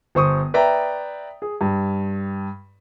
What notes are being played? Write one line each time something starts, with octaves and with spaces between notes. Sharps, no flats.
G1 C5 C#6 D#6
B4 D5 E5 G5 A#5
G#4
G2